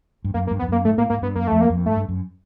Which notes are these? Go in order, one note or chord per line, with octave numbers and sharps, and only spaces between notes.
G2
F#2 A#3
A#3
G2
B3
F2
F#2 A#3
G#2 A3
A2 A#3
G#2 A#3
G2 B3
F#2 A#3
F2 A3
A#3
F2
G#2 A3
G2
F#2